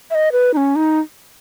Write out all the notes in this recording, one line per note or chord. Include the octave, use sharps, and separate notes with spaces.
E5
D#5
B4
D#4
C#4
D#4